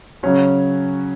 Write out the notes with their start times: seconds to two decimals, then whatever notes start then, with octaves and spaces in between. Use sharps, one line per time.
0.23 C#3 F#3 C#4 F#4